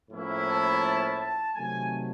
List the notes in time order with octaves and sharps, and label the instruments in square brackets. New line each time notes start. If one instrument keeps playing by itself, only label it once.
[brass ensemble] A2 F3 A#3 C#4 E4
A5
A5
A5
C3 D#3 F#3 A3 G#5